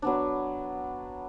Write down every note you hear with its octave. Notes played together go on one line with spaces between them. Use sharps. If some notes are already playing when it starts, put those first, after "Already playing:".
F#3 B3 D4